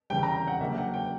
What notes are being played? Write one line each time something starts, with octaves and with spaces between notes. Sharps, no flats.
E2 C#3 G3 G5
A#5
G5
F#5
C#3 F#3 A#3 D4 E5
G5
F#5
G5